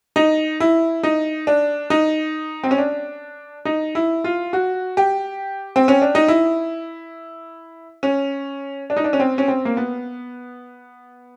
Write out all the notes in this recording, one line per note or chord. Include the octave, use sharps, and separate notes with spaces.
D#4
E4
D#4
D4
D#4
C4
C#4
D4
D#4
E4
F4
F#4
G4
C4
C#4
D4
D#4
E4
C#4
D4
D#4
D4
C#4
C4
C#4
C4
A#3
B3